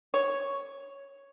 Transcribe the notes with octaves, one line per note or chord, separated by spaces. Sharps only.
C#5